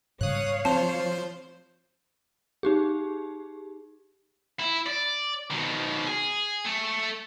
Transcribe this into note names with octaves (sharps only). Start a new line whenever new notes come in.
G#2 C#3 G3 C#5 F5 D#6 F#6
F3 C4 C5 A5
D#4 G4 G#4
E4
D5
B2 D#3
G#4
A3